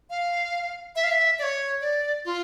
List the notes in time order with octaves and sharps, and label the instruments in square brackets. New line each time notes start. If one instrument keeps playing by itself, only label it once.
[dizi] F5
E5
F5
E5
D5
C#5
D5
F4